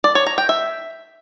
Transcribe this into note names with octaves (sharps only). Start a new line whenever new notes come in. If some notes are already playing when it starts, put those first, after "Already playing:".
D5
C#5
A#5
G5
E5